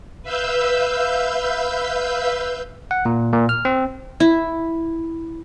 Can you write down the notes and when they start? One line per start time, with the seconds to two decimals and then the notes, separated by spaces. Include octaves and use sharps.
0.23 B4 E5 F5 E6 G6
2.91 F#5
3.05 A#2
3.33 A#2
3.49 F6
3.65 C4
4.20 E4